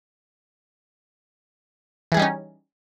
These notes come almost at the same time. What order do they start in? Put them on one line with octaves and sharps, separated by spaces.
E3 G#4 G3 D#4 C#4